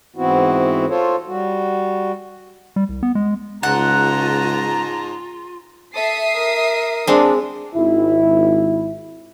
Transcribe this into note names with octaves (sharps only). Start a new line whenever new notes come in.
G#2 E3 B3 C4 E4 F#4
F4 A4 C5 C#5
G3 F#4
G3
C2
B3
G#3
C#2 G#2 F4 F#5 A5 A#5
A4 E5 D#6 C7
A#4
G#3 C4 D4
G#1 E4